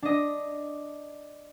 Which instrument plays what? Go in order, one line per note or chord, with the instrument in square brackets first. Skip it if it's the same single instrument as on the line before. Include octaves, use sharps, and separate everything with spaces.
[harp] D4 D#5